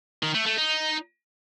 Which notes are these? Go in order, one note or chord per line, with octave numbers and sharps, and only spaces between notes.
D#3
A3
A3
D#4